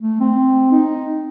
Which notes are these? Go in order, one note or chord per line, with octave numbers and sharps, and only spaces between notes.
A3
C4
D#4